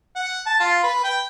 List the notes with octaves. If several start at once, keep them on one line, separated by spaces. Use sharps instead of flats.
F#5
A5
F4
B4
G5